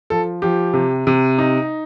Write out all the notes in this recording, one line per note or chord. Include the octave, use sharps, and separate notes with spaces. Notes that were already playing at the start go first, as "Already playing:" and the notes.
F3 A4
F3 G4
C3
C3
D#4